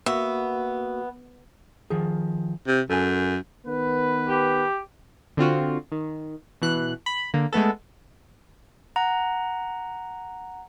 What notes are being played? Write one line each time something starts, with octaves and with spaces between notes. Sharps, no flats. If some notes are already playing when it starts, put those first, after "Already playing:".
A#3 B3 F#4 E5
D#3 F3 G#4
C3
F#2 A4 G#5
D#3 B3 B4
G4
D3 C4 F4 F#4
D#3
B2 E3 F#6
B5
D3 A#3
G#3 A3 B3 A4
F#5 A#5